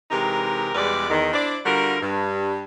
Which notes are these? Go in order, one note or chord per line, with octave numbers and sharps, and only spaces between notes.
C3 E3 G#3 D#4 G4 A#4
E2 B2 G3 G#3 B4 D5
E2 D#3
D4 E4 C5 D5
D3 G3 F4 F#4 A#4
G2